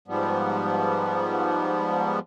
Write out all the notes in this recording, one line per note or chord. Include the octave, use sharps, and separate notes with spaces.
G#2 F3 G3 B3